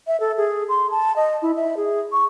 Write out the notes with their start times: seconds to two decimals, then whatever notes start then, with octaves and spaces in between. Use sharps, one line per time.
0.07 E5
0.20 A4
0.37 G#4
0.69 C6
0.91 A5
1.16 D#5
1.42 E4
1.56 E5
1.77 G#4
2.13 C#6